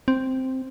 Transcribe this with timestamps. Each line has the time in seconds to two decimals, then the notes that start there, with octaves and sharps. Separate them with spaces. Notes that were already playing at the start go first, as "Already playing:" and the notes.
0.08 C4